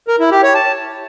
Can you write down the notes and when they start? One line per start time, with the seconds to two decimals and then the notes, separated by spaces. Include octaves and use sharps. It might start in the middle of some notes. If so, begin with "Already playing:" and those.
0.08 A#4
0.20 E4
0.31 G4
0.43 C#5
0.55 A5